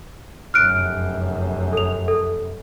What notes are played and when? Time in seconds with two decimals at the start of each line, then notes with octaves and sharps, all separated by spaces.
0.54 F1 F#2 F6 F#6 D7
1.73 A4 F7
2.08 A4